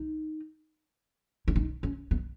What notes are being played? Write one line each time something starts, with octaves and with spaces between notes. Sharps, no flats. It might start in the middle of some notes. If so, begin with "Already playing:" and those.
Already playing: D#4
E4
D#4
C#4
B3